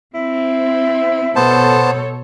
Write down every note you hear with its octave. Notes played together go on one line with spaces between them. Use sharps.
C4 E4
B2 B3 A4 C5 C#5 A5